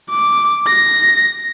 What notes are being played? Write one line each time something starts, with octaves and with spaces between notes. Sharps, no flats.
D6
A#6